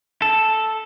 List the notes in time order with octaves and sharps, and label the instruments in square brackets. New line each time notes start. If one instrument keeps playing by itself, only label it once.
[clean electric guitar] A4